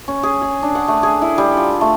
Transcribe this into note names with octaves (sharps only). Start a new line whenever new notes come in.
C#4
G#4
G#4
D4
F#5
A3
G#4
E4
G3
F4
A3